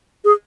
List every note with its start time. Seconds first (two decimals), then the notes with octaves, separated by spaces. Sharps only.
0.24 G#4